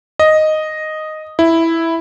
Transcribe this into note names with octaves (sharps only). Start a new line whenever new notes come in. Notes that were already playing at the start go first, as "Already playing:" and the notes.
D#5
E4